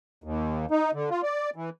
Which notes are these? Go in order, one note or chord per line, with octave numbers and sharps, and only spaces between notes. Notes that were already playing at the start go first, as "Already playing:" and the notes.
D#2
D#4
D3
F4
D5
E3